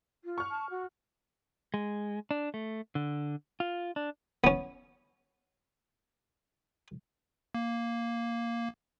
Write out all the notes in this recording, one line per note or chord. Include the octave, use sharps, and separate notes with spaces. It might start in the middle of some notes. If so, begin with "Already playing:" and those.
F4
C#6 F6
A5
F#4
G#3
D4
A3
D3
F4
D4
B3 C#4
A#3